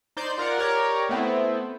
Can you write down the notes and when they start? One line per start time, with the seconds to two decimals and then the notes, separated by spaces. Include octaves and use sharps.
0.17 D#4 C5 D5 C6 G6
0.38 F4 A#4 D5 F#5
0.58 G4 A#4 C#5 D5
1.09 A3 B3 C4 E4